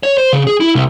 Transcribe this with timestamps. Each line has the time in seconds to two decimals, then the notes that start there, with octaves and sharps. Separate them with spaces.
0.03 C#5
0.18 C5
0.33 C#3
0.47 G#4
0.60 E4
0.75 C2